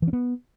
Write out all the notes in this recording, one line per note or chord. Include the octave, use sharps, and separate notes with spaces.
E3
C#4
B3